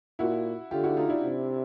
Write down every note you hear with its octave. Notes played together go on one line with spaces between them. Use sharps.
A#2 E4 F#4
D3 F4 G4
E4 F#4
D#4 F4
D4 E4
C3